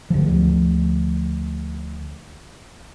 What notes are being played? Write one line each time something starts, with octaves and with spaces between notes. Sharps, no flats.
D2 F3